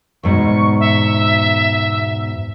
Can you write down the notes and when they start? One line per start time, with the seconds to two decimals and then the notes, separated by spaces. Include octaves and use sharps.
0.23 E2 G#2 B2 C#6
0.80 E5